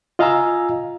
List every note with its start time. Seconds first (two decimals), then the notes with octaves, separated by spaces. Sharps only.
0.19 F4 D#5 F5 G#5 A#5 E6